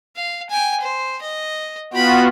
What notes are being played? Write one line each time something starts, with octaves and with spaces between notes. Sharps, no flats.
F5
G5 G#5
C5
D#5
B3 F4 F#4 G5 B5